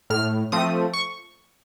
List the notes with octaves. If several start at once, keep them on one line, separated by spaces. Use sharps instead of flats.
A2 F6
F3 A3 C4 D#6
C#6